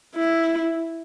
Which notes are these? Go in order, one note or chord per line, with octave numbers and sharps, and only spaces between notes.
E4